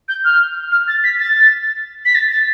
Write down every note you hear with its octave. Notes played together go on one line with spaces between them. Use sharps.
G6
F6
F6
A6
B6
A6
B6
A6
A6